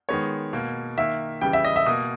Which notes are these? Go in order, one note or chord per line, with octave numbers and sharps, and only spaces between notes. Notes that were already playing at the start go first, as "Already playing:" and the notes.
D#3 G#3 B3 C#5
B2 A#3
D#3 A#3 E5
C#3 E3 G3 G5
E5
D#5
E5
B2 A#3 D#6